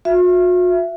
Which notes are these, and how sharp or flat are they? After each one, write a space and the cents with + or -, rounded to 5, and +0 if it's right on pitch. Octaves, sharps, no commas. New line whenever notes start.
F#4 -45 E5 +20